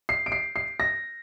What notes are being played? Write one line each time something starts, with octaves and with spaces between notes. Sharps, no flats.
C7
D7
C7
C7
A#6